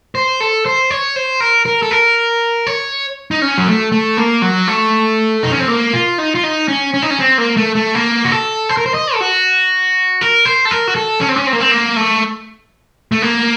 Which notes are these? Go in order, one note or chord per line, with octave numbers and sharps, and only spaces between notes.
C5
A4
C5
C#5
C5
A#4
A#4
A4
A#4
C#5
D#4
C#4
F#3
A3
A3
A#3
F#3
A3
D#4
C#4
C4
A#3
F4
D#4
F4
D#4
C#4
C#4
D#4
C#4
C4
A#3
A3
A3
A#3
F#4
A4
C5
A#4
C5
D#5
A4
F#4
A#4
C5
A4
A#4
F#4
A4
C#4
C4
C#4
C4
A#3
C4
A#3
A3
A3
A#3